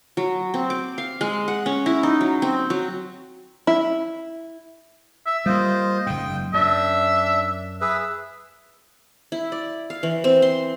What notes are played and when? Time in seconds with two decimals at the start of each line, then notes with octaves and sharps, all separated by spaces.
0.17 F#3
0.54 C4
0.70 D6
0.98 F5
1.21 G#3
1.48 F#5
1.66 C#4
1.86 E4
2.03 D#4
2.21 F#3
2.42 C4
2.70 F#3
3.67 E4
5.26 E5
5.46 G3 A#3 F4 C5 D#5
6.06 F#1 G#2 G5
6.54 F#2 D4 E5
7.81 G#4 B4 E5
9.32 E4
9.52 D5
9.90 F5
10.03 E3
10.24 C4
10.42 C6